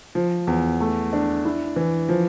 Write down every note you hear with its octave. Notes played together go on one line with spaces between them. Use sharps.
F3
E2
A3
D4
E4
E3
F3